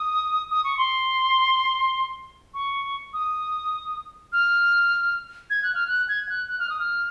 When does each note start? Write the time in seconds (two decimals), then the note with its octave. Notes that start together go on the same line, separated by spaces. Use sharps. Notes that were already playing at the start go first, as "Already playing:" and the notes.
Already playing: D#6
0.50 D#6
0.64 C#6
0.78 C6
2.54 C#6
3.13 D#6
4.32 F6
5.50 G#6
5.63 F#6
5.75 F6
5.87 F#6
6.09 G#6
6.29 F#6
6.49 F#6
6.59 F6
6.70 D#6
6.80 F6